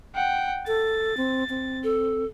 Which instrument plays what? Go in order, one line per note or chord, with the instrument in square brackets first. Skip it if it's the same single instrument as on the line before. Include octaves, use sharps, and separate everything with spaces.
[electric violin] F#5 G5
[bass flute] A4 [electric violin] A6
[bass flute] C4
C4
[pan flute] A4